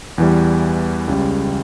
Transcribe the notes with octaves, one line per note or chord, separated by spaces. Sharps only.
E2 E3 G3
C#2 C#3 G3